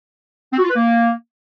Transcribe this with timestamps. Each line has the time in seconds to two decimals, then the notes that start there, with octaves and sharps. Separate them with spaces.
0.53 C4
0.59 F#4
0.64 F4
0.70 B4
0.76 A#3